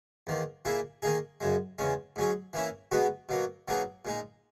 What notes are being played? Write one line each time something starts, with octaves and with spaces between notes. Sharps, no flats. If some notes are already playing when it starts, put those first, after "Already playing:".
E2 D#3 A#3
A#2 A#3 E4 G#4
D#3 A#3 D#4 G#4
F#2 C#3 G#3
E2 C#3 G#3 C#4
G#2 F#3 C#4 G#4
E3 A#3 C#4 E4
B2 G#3 B3 F#4
B2 F#3 A#3
B2 F#3 A#3 D#4 G#4
A#2 G#3 D#4